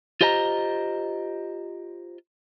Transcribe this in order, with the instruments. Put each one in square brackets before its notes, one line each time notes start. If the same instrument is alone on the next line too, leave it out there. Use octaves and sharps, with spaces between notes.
[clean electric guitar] F4 G4 C5 D#5 A5 A#5